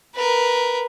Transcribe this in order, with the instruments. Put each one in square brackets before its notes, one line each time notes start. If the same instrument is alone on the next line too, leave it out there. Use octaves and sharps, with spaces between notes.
[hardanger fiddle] A#4 B4